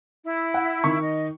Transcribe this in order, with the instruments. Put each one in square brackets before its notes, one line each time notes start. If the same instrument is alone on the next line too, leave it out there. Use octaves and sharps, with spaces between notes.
[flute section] E4
[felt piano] F#5
D#3 C#6
[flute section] D#5